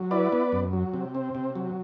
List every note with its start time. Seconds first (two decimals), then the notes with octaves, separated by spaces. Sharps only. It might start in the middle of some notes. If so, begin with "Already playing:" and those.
Already playing: F#3
0.11 E4 B4 D5
0.32 B3
0.52 F#2
0.73 F#3
0.94 C3
1.15 C4
1.35 C3
1.55 F#3